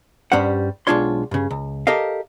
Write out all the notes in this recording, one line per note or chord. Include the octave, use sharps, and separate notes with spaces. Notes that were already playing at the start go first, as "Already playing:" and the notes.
G2 G3 C#4 C5 F#5
B1 G#3 D4 F4 C#5 C6
G2 C#3
C#2
G4 A4 A#4 D#5 F5